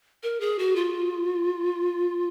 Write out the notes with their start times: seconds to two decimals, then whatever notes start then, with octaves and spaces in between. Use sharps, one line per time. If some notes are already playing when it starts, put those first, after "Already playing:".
0.23 A#4
0.40 G#4
0.59 F#4
0.76 F4